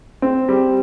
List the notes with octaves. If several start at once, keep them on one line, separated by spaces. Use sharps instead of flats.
C4
G3